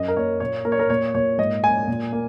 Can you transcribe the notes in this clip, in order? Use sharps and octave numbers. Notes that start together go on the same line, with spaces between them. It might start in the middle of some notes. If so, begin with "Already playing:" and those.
Already playing: F#2 D#5
A#4
A#3 C#5
A#2 C#5
A#3 A#4
C#5
A#4
A#2 C#5
A#2 C#5
G#2 D#5
A#3 G#5
A#2
A#3